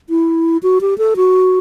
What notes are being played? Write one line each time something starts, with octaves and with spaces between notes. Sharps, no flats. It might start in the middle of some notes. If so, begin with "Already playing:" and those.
E4
F#4
G4
A4
F#4